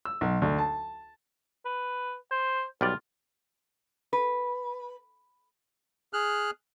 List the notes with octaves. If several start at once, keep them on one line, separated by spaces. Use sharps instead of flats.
E6
B1
D2
A5
B4
C5
B1 G3 F4 D5
B4
G#4 F6 F#6